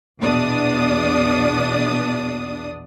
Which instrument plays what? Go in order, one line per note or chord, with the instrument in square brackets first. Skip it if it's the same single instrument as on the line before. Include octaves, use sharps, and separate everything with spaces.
[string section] A#1 E2 B2 D4 D5 D#6